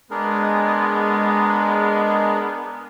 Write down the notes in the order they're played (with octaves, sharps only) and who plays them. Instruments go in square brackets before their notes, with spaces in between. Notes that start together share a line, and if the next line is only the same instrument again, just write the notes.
[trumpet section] G#3 [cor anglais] B3 [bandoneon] D4 G#4 A#4